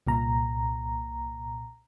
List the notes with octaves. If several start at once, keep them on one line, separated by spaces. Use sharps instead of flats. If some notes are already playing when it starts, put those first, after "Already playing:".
C2 A#2 A#5